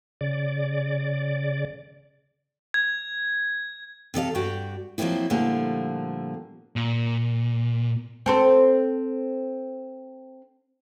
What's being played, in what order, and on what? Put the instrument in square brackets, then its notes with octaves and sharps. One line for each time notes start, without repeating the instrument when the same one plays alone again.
[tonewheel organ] C#3 D5
[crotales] G#6
[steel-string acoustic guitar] C3 A4 D5 F5
G2 F#4 G4 D5 G5
F3 F#3 G#3 A#3 C4 E4
A#2 D3 F3 G3 A3 A#3
[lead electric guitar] A#2
[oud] C4 A4 C5